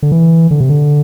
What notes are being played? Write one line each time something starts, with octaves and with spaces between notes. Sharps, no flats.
D3
E3
D3
C3
D3